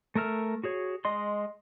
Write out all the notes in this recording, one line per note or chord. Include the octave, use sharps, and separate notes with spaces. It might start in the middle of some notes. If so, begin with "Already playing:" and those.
A3 A#4 E5 F6
F#4 G#4 C#5
G#3 D#5 C6